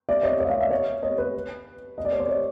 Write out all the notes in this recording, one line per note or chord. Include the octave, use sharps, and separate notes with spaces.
D5 E5
C#5 D#5
C#5 D#5
E5
D#5 F5
D5 E5
C#5 D#5
C#5 D#5
B4 C#5
D#5
D5
C#5
C5 D5
C#5 D#5